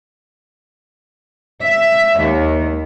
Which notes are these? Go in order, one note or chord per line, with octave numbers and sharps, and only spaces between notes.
E5
D#2